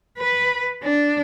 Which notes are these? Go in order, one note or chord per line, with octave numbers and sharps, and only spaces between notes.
B4
D4